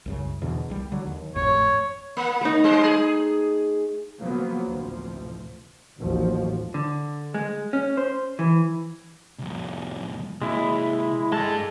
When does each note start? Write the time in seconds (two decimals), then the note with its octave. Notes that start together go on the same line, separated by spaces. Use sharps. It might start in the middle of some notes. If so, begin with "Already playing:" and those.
0.06 C2 F#2 C#3
0.42 E2 B2 D3
0.70 C2 G3
0.92 D3 F#3
1.07 D#2
1.36 G#1 F2 A2 C#5
2.17 A#3
2.41 A3 D#4
2.64 G3 C5
2.83 G#4
4.19 C#3 F3 F#3 A#3 B3
4.65 A1 D2 C3 F3
5.98 A1 D#2 F3 F#3
6.74 D3
7.34 G#3
7.73 C#4
7.97 C5
8.39 E3
9.39 C2 F2
10.42 C3 G#3 A#3 E4
11.32 G2 G#3 A4 A5